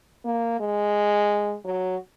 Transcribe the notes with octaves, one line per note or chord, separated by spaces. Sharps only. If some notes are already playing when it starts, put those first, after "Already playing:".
A#3
G#3
F#3